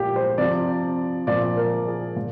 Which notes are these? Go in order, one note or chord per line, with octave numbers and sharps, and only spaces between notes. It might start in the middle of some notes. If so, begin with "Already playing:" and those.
Already playing: A#2 F3 G4
C5
C3 F3 D5
A#2 F3 D5
A#4
G#4
A#2